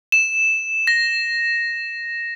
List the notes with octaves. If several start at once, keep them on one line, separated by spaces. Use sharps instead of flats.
E7
A#6